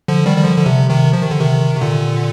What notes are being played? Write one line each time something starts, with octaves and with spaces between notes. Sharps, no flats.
D3 F3
D#3 G3
G3
D3 F3
D3
C3
C3 D#3
F3
D#3
D3
C3 D#3
C3
A#2 D3